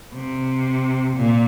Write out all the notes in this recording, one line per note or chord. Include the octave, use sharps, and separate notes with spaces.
C3
A#2